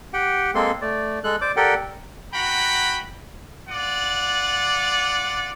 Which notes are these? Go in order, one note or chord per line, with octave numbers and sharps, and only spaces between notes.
G4 F#5 G5
G#3 A#3 C4 A4 C6
A3 D5
G#3 A4 F#6
C5 D5 D6
G4 A4 A#4 D5 F#5 G5
F#4 F#5 G5 A#5 B5
F4 D5 F#5